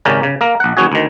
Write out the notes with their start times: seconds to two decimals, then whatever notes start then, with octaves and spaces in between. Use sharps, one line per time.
0.05 G#1 C#3 C#4 G4 A#4 D5
0.23 C#3
0.41 A#3 A#4
0.60 A#1 F#5
0.77 D#2 F#3 C#4 F#4 G#4
0.92 D2 D#3